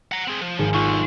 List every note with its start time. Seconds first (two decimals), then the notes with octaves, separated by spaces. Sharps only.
0.12 F#5 A#5
0.28 C4 G#4
0.42 F3
0.59 G#1 G#4 C#7
0.74 B1 D3 F4 C#6